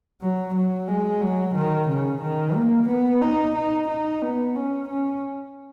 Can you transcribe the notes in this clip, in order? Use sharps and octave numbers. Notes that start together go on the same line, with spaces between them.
F#3
F#3
G#3
F#3
D#3
C#3
D#3
A#3
B3
D#4
D#4
D#4
B3
C#4
C#4